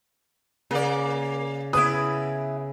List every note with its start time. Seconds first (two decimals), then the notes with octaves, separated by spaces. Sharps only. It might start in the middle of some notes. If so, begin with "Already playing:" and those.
0.71 C#3 A#3 D5
1.73 C#3 B3 E4 B4 D#6